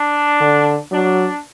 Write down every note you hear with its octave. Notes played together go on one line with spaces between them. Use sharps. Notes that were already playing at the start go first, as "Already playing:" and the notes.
Already playing: D4
D3
F#3 D4